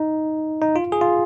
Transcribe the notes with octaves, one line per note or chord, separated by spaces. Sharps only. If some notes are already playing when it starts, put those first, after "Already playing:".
Already playing: D#4
D#4
F4
G#4
F4